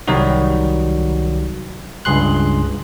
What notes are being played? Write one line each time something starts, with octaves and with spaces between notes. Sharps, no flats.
C2 D#3 F#3 G3 F#4
C#2 G2 G#4 C6 F#6